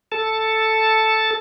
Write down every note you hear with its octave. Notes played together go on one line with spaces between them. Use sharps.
A4 A5